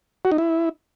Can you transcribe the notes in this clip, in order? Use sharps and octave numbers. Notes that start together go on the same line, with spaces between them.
F#4
D#4
E4